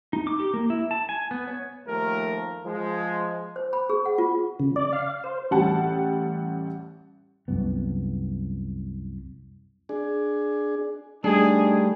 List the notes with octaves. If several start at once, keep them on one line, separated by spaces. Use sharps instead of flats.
D#4
D6
G4
A#3
E4
A5
G#5
B3
C#5
D#2 F3 A3 A#4
F3 G#3
C5
B5
G#4
F#5
F4
C#3
D5
F5
C5
A1 G3 F#5 A5
C2 F#2 B3
D4 G#4
G3 A3 D4 D#4 G#4